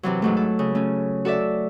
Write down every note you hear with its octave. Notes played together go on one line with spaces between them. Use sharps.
C3 E3 F#3
G#2 F#3 A3
A4
C#3
A3 C#4
F#4 A4 D5 E5